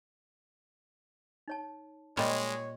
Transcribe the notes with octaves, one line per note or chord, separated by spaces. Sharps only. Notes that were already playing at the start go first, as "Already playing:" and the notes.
D#4 C#5 A5
A#2 G3 G#3 C#5 D#5 C6